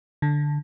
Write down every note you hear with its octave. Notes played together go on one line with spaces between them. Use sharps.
D3